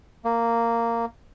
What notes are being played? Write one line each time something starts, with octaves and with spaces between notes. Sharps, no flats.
A#3